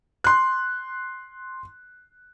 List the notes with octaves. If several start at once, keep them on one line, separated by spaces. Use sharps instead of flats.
C6 F#6